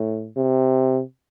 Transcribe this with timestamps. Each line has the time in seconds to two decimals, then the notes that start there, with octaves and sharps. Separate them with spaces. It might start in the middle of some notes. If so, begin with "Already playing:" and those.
Already playing: A2
0.36 C3